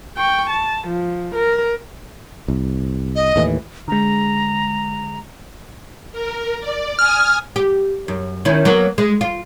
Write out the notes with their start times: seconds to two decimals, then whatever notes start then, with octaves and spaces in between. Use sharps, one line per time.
0.17 G5 C#6
0.50 A5
0.87 F3
1.35 A#4
2.48 C2
3.15 D#5
3.36 D#2 A2 E3
3.88 D3 G#3 A#5
6.12 A#4
6.60 D5
6.99 G#5 D#6 F6
7.56 G4
8.08 F#2
8.45 D#3 C#4 E4
8.65 F#3 A#3 B3
8.98 G#3
9.21 F4